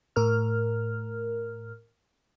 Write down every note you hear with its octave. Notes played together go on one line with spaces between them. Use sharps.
A2 A#4 F6